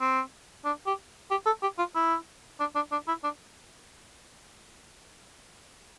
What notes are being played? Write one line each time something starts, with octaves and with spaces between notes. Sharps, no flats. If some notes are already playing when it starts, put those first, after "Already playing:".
C4
D4
G4
G4
A4
G4
F4
E4
D4
D4
D4
E4
D4